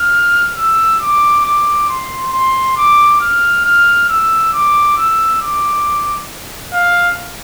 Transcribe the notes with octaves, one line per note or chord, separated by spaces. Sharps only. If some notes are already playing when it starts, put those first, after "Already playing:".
Already playing: F6
E6
D6
D6
C6
C6
D6
F6
F6
E6
D6
E6
D6
F5